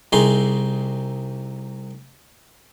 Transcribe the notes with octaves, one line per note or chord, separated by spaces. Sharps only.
C2 C3 D#4 G#4 C6